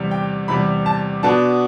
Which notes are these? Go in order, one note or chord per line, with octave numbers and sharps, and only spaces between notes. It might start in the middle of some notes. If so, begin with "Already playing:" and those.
Already playing: E2 C3 G3
G5
E2 C3 G3 B5
A5
B2 B3 D4 A5